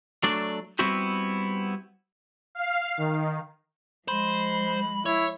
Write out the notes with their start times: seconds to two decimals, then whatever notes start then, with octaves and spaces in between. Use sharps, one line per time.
0.23 F#3 A3 D4 D5
0.79 G3 B3 C4 E4 F#4 G4
2.55 F5
2.97 D#3
4.08 F3 G#3 C5 B5
5.06 E4 C#5